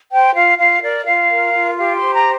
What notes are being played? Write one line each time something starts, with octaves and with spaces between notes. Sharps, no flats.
C5 G5
F4 F5
F4 F5
A#4 D5
F4 F5
A#4
F4
G4 F5
C6
C5
A#5